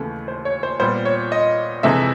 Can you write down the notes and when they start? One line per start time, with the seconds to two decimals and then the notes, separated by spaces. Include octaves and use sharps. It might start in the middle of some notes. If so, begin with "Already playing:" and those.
Already playing: D#2 C#3 E3 A3
0.28 C5
0.45 C#5
0.63 C5
0.79 A#2 G3 B3 C5
1.05 C#5
1.32 D#5
1.83 F2 C3 E3 G#3 E5